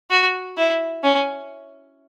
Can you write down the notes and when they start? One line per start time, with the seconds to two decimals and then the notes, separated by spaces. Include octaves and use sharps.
0.10 F#4
0.57 E4
1.03 C#4